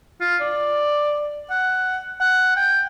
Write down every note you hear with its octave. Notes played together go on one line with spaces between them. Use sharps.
F4
D5
F#5
F#5
G5